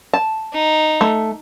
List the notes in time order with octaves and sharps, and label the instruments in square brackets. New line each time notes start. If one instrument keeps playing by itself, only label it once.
[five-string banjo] A5
[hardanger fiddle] D#4
[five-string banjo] A3